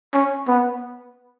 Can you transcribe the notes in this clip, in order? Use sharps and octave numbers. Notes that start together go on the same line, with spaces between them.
C#4
B3